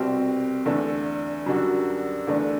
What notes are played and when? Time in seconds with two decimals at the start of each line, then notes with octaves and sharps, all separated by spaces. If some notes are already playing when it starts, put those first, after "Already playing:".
Already playing: C2 B2 G3 C4
0.65 E2 D3 A3 D4 A4
1.46 F#2 D3 G3 D4 F#4
2.27 E2 D3 A3 D4